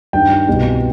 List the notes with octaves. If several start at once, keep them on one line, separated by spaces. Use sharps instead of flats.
G2 D#3 G5
C2 B2